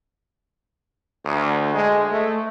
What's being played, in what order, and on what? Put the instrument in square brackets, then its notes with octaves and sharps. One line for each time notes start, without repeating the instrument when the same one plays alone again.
[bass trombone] D2
G#3
A3